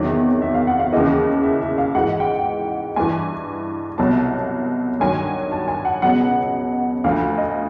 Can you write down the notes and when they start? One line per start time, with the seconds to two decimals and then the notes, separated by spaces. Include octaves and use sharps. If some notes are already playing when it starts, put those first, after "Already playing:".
Already playing: E2 C3 D#3 F#3 E5
0.42 E5
0.54 F5
0.67 F#5
0.79 F5
0.92 D#2 C#3 E3 D#5
1.43 E5
1.61 E5
1.78 F5
1.95 G#2 E3 F#5
2.20 G5
2.96 G2 E3 G#5
3.98 C2 B2 F#3 A5
5.00 G2 D#3 F#3 G#5
5.51 A5
5.68 G#5
5.85 F#5
6.02 C#2 B2 F#3 F#5
7.04 D2 D3 F3 F5
7.38 D#5